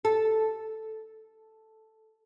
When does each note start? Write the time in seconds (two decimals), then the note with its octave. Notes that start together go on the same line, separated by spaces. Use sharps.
0.05 A4